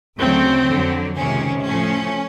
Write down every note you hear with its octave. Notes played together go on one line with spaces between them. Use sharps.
D2 C#3 F#3 A3 C4
F2 D3 F#3
C#2 C3 D#3 C#4
A2 F3 A3 C#4